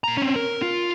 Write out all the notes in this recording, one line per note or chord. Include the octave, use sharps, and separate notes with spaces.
A#2 A#5
C4 C#4
A#4
F4